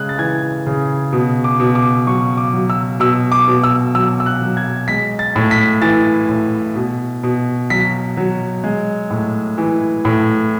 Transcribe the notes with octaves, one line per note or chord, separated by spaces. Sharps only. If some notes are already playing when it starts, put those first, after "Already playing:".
Already playing: C#3 G#3 F#6
A6
E3 G#6
C#3
B2
D6
B2
D6
F#3 C#6
D6
F#3
E6
B2 E6
D6
B2
E6
F#3 E6
E6
F#6
F#3
G#6
G#3 B6
A6
A2
B6
E3 A6
A2
B2
B2
F#3 B6
F#3
G#3
A2
E3
A2